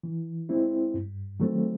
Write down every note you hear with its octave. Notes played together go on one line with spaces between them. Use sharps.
E3
G#3 C4 E4
G2
D#3 F#3 A3 C4